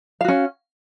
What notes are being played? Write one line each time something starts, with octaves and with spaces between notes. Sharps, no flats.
C#4 F#4 F5